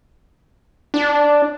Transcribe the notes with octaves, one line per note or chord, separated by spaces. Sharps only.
D4